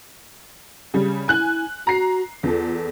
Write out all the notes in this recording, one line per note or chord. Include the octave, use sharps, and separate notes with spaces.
C#3 G3
E4 G#5 F#6 F#7
F#4 A#5 C7
E2 F4 A4